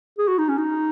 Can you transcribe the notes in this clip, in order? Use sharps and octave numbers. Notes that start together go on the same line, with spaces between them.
G#4
F#4
D#4
C#4
D#4